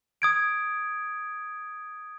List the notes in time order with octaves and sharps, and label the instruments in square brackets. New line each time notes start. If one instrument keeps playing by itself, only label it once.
[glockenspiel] D#6 G#6 D7